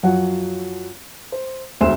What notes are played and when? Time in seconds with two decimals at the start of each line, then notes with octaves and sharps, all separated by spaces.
0.03 F#2 F3 F#3 F#5
1.32 C5
1.81 E1 D2 C5 E5 C6 E7